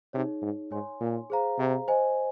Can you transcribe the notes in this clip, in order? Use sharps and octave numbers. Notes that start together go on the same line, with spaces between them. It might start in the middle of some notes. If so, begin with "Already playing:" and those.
C3 D#4 G#4 C#5
G#2
G#2 C#5 G#5 C6
A#2
G#4 C5 F5 A#5
C3
C5 D#5 G#5